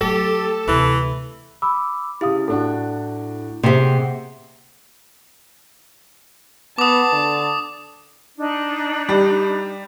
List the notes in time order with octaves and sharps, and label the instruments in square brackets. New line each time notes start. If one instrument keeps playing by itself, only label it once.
[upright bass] F#3 A3 [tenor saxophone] G4 [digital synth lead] A4
[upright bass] D2 C3 [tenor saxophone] E3
[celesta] B5 D6 E6
[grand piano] C#3 E5 [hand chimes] E4 [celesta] G4 F5 D#6
[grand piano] A2 D4 F#4 [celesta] A4
[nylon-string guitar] C3 G4 [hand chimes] A#3 G#4 F#5 [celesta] E5 C6
[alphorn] B3 [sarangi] A5 [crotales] D6 D#6
[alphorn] D3
[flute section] D4 D#4
[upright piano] G3